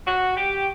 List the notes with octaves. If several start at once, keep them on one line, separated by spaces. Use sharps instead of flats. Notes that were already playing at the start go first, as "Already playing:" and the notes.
F#4
G4